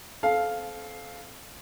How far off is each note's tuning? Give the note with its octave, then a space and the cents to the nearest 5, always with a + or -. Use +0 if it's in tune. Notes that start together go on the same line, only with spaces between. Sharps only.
C4 -10 A4 -30 F5 +0